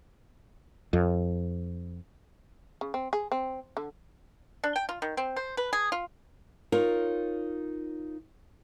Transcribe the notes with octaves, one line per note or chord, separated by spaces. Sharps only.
F2
C#3
C4
G#4
C4
D3
D4
G5
F4
D#3
C4
C5
B4
G#4
F4
D#4 F4 A#4 C#5